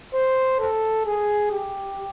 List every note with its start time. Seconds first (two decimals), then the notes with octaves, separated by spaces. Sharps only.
0.14 C5
0.60 A4
1.06 G#4
1.52 G4